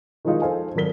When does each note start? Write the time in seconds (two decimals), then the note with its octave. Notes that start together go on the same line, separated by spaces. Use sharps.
0.25 D#3 F3 G3 G#3 D#4 F4
0.42 A4 C5 D#5 F5 G#5
0.75 G#1 F#3 A4 A#4 B6 G7